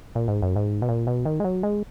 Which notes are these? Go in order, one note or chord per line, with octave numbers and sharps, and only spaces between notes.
A#2
G#2
F#2
G#2
B2
A#2
B2
D#3
G#3
F#3
G#3